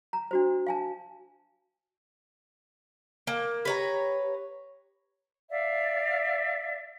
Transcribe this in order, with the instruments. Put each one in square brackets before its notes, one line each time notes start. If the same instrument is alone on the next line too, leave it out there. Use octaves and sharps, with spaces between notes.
[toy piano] A#5
D4 F#4 C5
F5 G#5 A5
[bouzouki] A#3
[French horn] G4 [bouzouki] B4 C#5 A#5
[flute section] D5 E5 F5